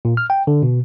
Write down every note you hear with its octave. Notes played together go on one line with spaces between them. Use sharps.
A#2
F6
G5
D3
B2